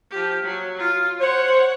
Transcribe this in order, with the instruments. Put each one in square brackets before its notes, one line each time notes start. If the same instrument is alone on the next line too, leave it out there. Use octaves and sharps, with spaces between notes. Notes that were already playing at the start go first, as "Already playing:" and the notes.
[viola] F3 G4
F#3
F4
[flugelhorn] C5 [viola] C#5 F#5